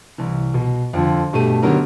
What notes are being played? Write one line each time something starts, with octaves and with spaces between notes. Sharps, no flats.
C2 E3
B2
F2 D3 F3
G2 B2 A3 G4 D#7
D3 D#3 F#3 B3 G4 A#4